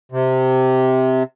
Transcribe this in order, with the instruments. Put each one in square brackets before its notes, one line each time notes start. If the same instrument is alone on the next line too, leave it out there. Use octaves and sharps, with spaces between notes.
[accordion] C3